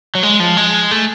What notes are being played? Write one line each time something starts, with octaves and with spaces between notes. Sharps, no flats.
F#3
G#3
F3
G#3
A3